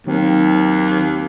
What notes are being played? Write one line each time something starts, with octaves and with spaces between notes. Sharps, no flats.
D#2 D#3 F#3 C4